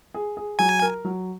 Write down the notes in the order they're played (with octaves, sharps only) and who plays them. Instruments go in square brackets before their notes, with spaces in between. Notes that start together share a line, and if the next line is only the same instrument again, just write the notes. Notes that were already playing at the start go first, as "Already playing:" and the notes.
[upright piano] G#4
G#4
[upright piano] F#3 [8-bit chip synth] G#5
[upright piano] A#4
F#3